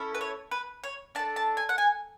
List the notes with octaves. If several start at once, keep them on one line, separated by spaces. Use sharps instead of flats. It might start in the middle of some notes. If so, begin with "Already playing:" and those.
Already playing: C#4 E4 A4
B4
C#5
B4
C#5
D4 A4 A5
A5
G#5
F#5
G#5